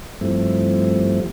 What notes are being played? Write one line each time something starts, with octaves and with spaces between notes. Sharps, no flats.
G2 F3 G3 A3 C4 E4